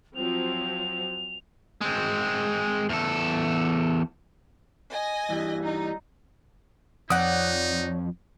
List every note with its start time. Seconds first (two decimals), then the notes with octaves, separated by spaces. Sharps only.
0.15 F3 F#3 C4 F7
1.81 G#3 C4
2.89 E2 A4
4.93 D#5 G#5 A#6
5.29 G2 E3 G3
5.63 D#4
7.10 F2 D#4 C#5 D5 F#5 D#6